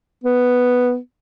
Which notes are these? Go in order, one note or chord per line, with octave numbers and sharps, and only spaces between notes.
B3